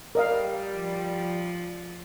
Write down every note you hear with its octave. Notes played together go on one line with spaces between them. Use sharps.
G3 A#4 D#5 F5
F3